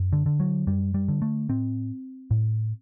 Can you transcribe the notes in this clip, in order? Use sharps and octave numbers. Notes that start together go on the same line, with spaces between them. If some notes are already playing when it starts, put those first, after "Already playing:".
Already playing: F#2
D3
D3
F#3
F#2 G3
G3
D3
A3
A2 C4
A2